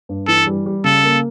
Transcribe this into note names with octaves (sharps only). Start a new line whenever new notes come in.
G2
E3 A4
G3
G3
C#3 A4
A#3